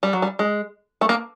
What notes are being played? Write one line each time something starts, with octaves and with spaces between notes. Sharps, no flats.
G3
F#3
G3
G#3
A3
A#3